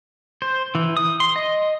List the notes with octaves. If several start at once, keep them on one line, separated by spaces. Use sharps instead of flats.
C5
E3
D#6
C6
D#5